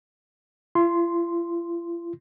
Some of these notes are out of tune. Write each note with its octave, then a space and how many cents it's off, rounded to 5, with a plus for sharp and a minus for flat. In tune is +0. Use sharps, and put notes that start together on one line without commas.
F4 -45 C6 -5